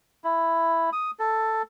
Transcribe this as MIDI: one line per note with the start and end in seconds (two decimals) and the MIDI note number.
0.24 0.90 64
0.93 1.11 87
1.19 1.62 69